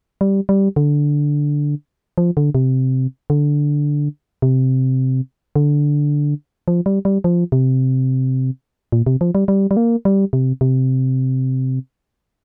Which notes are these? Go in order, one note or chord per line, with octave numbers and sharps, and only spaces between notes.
G3
G3
D3
F3
D3
C3
D3
C3
D3
F3
G3
G3
F3
C3
A#2
C3
F3
G3
G3
G3
A#3
G3
C3
C3